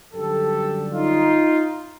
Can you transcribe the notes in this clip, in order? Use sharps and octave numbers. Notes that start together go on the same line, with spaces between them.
F#2 D3 G3 G4 A4
D#4 F4